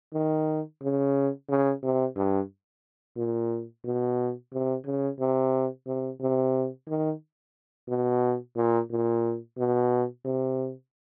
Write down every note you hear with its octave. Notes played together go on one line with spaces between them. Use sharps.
D#3
C#3
C#3
C3
G2
A#2
B2
C3
C#3
C3
C3
C3
D#3
B2
A#2
A#2
B2
C3